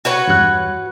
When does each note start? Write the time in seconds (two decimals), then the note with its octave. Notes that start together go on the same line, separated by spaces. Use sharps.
0.05 F#4 B4 C#5
0.27 E2 G2 F#6